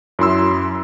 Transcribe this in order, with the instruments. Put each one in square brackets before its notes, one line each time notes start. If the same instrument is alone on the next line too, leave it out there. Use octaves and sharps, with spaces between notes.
[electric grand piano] F#2 E4 C6 E6